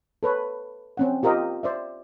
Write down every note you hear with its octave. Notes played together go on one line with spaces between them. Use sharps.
A4 B4 C#5
C4 C#4 F#5
F4 G4 A#4 C5 D#5
C5 D5 E5